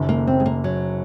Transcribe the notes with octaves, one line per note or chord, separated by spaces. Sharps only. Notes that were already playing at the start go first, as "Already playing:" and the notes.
Already playing: F#1 F#2 D#3
A#3
C4
G#3
A#3
F#3